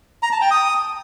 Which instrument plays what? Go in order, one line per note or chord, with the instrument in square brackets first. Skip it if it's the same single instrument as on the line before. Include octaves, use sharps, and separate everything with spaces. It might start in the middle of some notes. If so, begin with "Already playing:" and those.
[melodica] A#5
A5
G5
D#6